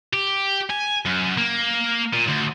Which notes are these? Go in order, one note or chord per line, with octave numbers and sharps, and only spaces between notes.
G4
G#5
F#2
A#3
A#2
D2